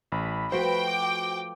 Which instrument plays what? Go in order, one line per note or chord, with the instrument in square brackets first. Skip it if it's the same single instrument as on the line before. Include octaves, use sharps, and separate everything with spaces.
[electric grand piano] A1 [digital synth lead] B5
[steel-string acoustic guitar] F3 A3 B4 [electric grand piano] F#4 C5 [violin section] G5
[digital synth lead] D6